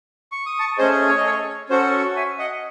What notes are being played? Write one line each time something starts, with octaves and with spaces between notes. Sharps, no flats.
C#6
D#6
A5 C#6
A3 C#4 G#4 C5 D#5
C#5
D#5
A4 C#5
C#4 F#4 A4 C5
E5 G#5
D#5 F#5